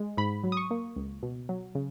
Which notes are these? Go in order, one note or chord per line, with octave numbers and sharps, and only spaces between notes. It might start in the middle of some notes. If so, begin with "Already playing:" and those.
Already playing: G#3
G#2 B5
F#3
D#6
C#6
A#3
C#2
B2
F#3
C#3